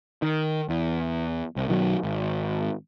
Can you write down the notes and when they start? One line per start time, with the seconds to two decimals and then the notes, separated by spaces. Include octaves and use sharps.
0.22 D#3
0.69 E2
1.56 C2
1.68 B1 D#3 F#3
2.03 G#1